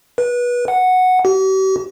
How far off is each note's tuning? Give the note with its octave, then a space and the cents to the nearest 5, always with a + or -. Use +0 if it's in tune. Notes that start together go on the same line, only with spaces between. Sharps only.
B4 -25
F#5 -5
G4 -45